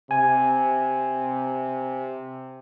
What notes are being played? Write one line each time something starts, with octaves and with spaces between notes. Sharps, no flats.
C3 G#5